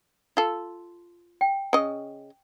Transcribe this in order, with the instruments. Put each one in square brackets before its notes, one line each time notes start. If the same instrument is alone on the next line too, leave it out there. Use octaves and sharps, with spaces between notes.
[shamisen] F4 A4
[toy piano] G5
[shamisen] C#3 D#5